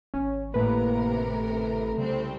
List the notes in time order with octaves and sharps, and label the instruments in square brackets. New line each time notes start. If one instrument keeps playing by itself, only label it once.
[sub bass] G#1 [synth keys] C#4
[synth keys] A2 B4 [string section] C3 A#4 [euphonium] A#3
[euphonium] A3
[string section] C2 C4 [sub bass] C#3